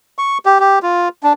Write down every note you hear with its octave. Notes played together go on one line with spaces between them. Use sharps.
C#6
G4
G4
F4
D4